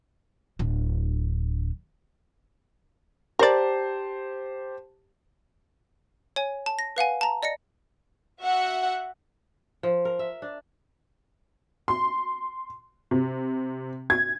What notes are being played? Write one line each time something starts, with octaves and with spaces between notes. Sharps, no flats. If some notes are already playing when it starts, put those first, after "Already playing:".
D1 D4
G4 A#4 C5 D5 A5
C#5 G#5
A5
A#6
B4 F5 F#5 G#5
A5 A#5
D5 D#5 A#6 C#7
F#4 E5 F#5
F3
A#4
E5
D4
C6
C3
G#6